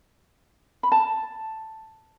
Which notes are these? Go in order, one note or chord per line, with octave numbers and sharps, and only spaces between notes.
B5
A5